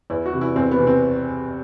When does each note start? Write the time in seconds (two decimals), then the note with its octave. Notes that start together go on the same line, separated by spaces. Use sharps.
0.10 E2 E4
0.26 F#4
0.33 C3 E3
0.41 E4
0.56 E2 C4
0.71 B3
0.79 C3 E3
0.87 C4